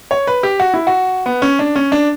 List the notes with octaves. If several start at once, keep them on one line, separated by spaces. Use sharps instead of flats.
C#5
B4
G4
F#4
E4
F#4
B3
C#4
D4
C#4
D4